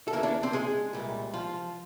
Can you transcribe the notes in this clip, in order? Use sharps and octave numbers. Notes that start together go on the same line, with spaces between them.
A4
D#2 C#3 E3 A#3 A#4
D4 D5
C4 C5
G#3 G#4
C2 A#2 G3
F3 F4